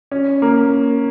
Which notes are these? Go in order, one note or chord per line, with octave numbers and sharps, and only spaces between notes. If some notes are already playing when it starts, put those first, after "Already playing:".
C#4
A#3